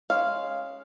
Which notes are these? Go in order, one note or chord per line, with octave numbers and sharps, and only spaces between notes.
G#3 C#4 F5